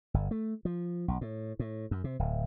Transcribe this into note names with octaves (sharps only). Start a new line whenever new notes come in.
G1
A3
F3
B1
A2
A2
F#2
C3
D1